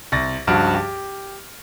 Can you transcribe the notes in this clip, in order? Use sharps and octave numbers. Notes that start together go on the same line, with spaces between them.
C2 A6 A#6
C#2 G2 F3 F#4 F6 D7
G4